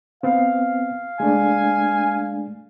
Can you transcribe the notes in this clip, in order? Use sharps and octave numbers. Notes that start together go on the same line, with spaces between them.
B3 C4 F5
G#3 A3 D4 G#5